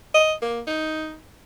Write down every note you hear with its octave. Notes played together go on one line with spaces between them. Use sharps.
D#5
A#3
D#4